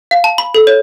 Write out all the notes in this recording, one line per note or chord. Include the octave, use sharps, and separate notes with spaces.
F5
A5
B5
A4
C#5